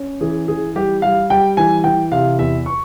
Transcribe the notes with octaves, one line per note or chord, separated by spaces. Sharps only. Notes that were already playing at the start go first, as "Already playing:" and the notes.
Already playing: C#4
E3 G#4
E3 G#4
G3 G4
G3 F5
G3 G5
E3 G#5
E3 G5
C3 F5
E2 E5
C#6